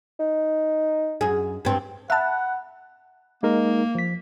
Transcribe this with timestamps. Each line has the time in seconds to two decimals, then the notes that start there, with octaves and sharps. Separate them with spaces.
0.20 D#4
1.21 F#2 G#4
1.65 G2 C4
2.10 E5 F#5 A5 B5 F#6
3.43 G#3 A#3 D#4 A#4
3.95 F3 B6